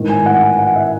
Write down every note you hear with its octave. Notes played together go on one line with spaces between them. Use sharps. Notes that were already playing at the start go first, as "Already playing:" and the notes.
Already playing: A1 G#2 D#3
G#5
F#5
G#5
F#5
E5